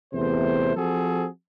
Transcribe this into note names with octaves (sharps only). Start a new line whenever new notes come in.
E2 C3 A3 C5
F3 C4 F#4 G#4 A4